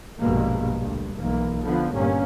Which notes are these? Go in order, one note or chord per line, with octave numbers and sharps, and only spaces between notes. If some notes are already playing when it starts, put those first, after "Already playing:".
A#1 G2 B2 G#3 A#3
D2 G2
B1 E3 A#3
D3 F3 B3
G1 G2 A#2 A#3 C#4